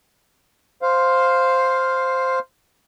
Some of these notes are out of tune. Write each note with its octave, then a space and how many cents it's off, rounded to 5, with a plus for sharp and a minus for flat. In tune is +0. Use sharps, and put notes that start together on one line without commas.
C5 +0 F5 +5